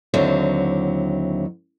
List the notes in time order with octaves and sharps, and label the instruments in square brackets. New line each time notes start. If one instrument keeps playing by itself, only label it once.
[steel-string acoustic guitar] D#2 D3 F#3 C4 E4